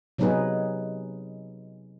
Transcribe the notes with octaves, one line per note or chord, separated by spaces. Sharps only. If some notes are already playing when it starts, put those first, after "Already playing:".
C3 F#3 B3 D#4 G#4 B4